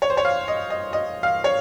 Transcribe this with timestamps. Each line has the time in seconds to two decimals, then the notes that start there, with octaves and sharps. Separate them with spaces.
0.02 C#5
0.10 C5
0.17 C#5
0.25 F5
0.48 D#5
0.70 D#5
0.93 D#5
1.23 F5
1.44 C#5